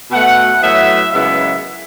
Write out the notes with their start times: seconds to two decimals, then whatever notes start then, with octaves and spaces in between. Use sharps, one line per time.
0.11 B2 A3 F#5
0.62 A2 F#3 B3 E5
1.13 F#2 C#3 E3 G#3 B3 E5